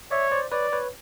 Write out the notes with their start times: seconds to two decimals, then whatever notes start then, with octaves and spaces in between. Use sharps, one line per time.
0.11 C#5 D5 E5
0.32 C5 D5
0.52 B4 C#5 D5
0.72 B4 C#5